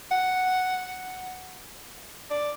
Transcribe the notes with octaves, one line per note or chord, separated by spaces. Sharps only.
F#5
D5